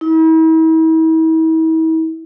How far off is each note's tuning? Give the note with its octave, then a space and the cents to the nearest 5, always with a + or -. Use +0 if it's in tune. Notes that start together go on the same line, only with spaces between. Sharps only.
E4 -45